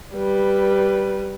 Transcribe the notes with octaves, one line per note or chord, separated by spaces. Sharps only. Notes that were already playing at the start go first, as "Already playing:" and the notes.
G3 B4